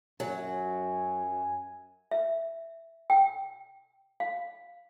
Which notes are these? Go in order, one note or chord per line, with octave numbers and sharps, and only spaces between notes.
F#2 F#3 G#5
E5
G5
F5